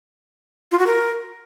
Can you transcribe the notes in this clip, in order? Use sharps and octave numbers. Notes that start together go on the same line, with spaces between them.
F4
F#4
A#4